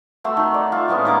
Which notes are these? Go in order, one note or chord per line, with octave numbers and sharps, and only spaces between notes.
A3 F#4 E5 C6
D#3
D5
F4 E5
A2 G#3 B3 C#4
D#3 A#3 D6